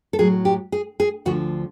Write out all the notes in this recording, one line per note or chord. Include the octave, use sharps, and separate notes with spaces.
A4
A2 F#3 G#4
G4
G#4
G#4
D2 D3 F3 F#4